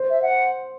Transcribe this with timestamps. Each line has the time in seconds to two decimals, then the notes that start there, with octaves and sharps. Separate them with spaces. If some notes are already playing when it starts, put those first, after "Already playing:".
Already playing: C5
0.10 E5
0.22 F#5